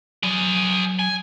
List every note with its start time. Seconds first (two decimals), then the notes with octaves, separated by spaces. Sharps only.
0.23 F#3 G#4 D5
0.99 G#5